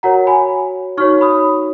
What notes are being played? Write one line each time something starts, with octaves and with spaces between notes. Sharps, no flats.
F#4 A#4 C#5 F#5 A#5
G#5 B5
D#4 F#4 C#5 C#6 F6
B5 D#6